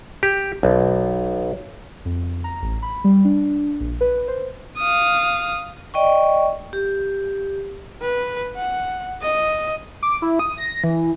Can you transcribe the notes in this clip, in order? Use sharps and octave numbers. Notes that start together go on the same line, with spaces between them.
G4
B1
F2
A#5
A1
B5
G3
D4
A#1
B4
C5
F5 D#6
D5 D#5 G5 C#6
G4
B4
F#5
D#5
D6
E4
D#6
A#6
E3